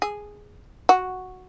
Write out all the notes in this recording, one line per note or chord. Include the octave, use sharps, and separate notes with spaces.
G#4
F#4